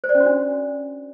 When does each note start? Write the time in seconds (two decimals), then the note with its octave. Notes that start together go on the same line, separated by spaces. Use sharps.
0.04 C5
0.09 D5
0.15 C#4
0.20 F#4
0.26 D4